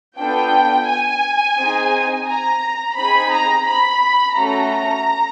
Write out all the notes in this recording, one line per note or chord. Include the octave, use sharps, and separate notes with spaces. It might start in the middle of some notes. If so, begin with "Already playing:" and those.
B3 D4 F4 A4 G5
G#5
C4 D#4 G#4
A#5
C4 D#4 G#4 B5
A#5
B5
A3 C#4 F#4 A4 A#5